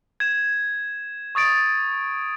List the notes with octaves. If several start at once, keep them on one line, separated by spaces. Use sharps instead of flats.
G#6 E7
C#6 D#6 A6 D7